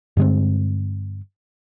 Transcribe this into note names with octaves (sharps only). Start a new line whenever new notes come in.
G2 D3 G#3 C4